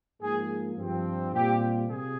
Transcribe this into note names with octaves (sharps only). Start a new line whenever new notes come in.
G#2 F3 A#3 G#4
G2 F3 C4
A#2 G3 C4 F4 G4
C3 G#4